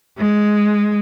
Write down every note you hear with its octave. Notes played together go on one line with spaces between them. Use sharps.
G#3